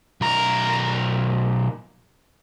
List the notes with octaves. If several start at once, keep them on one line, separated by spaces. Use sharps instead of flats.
B1 A#4